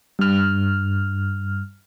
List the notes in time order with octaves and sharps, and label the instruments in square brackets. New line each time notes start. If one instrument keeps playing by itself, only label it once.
[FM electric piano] G2 F6